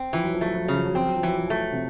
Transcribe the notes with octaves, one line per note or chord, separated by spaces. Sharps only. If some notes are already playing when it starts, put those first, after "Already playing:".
Already playing: C4
E3 F3
F#3
F3
F#3 A3
F3
C#3 F#3
F3
F#3
F3 C4
F#3
F3
E3 F#3
F3
A3
C3